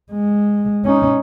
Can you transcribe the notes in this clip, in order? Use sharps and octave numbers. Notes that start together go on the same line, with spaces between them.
G#3
C#4 D#4